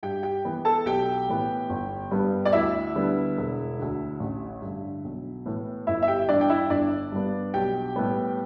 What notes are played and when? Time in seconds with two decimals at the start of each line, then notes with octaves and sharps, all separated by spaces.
0.03 G2 G4 G5
0.23 G4 G5
0.45 E3 B3
0.65 A4 A5
0.86 B1 G4 G5
1.28 A2 E3 B3
1.69 G1
2.11 G2 G3 B3
2.45 D5
2.53 D2 E4 E5
2.96 D3 G3 B3
3.37 E1
3.79 D2 D3
4.20 A1
4.62 G2 D3
5.04 B1
5.46 A2 E3 B3
5.87 G1 E4 E5
6.03 E5
6.08 G4 G5
6.29 G2 E3 D4 D5
6.41 G5
6.50 E4 E5
6.70 G1 D4 D5
7.12 G2 G3 B3
7.54 B1 G4 G5
7.96 A2 G3 B3